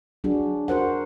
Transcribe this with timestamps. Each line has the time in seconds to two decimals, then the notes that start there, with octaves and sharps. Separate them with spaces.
0.24 F#3 D4 F#4 G#4
0.68 F#4 A#4 C5 F#5